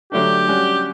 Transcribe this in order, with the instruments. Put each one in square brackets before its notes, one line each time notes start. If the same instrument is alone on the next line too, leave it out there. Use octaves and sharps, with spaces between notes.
[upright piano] D3 F#3 A3 D4 [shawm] G4
[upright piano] G3 C#4 F#4